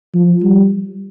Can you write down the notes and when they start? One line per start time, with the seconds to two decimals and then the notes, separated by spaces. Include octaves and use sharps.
0.15 F3
0.43 G3